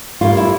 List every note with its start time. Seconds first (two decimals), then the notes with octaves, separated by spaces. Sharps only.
0.21 A2 G3 A#3 F4
0.37 E4